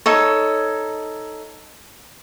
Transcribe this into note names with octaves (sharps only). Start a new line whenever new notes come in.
D#4 A4 C#5